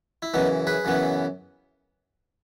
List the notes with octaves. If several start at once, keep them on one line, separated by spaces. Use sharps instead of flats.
E4
F#2 C#3 E3 B3 D#4
G#4 B4
F#2 C#3 E3 B3